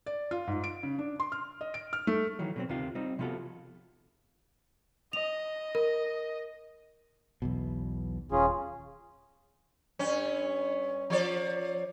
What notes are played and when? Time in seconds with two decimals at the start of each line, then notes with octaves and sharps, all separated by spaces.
0.06 D5
0.31 F4
0.47 G#2
0.64 D7
0.83 C#3
0.99 D4
1.20 C6
1.32 F6
1.61 D#5
1.74 D7
1.93 F6
2.07 A3
2.39 D#3 E3 F#3
2.56 B2 F#3 C4
2.69 D2 C3 D#3 F4
2.95 G3 C4 D#4
3.19 C3 F3 B3 F4 F#4 A4
5.13 D#5 F7
5.75 A#4
7.42 B1 E2 B2
8.32 D#1 C#4 F4 G#4
9.99 G2 C#4
11.10 F3 C#5 D5